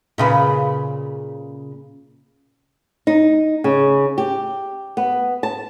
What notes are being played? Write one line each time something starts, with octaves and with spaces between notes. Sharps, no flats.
A#2 C#3 B4
D#4
C#3
G4
B3
A5